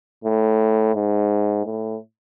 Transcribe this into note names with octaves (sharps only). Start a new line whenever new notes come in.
A2
G#2
A2